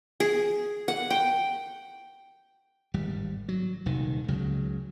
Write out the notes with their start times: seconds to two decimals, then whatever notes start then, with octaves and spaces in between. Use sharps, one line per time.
0.20 G#4
0.88 F#5
1.10 G5
2.94 G#1 G3
3.48 F#3
3.86 D#1 C2 D#3
4.28 C#2 C#3 F#3